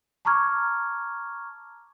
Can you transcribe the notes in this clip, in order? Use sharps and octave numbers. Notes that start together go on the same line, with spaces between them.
A5 A#5 C#6 D6 F6 G#6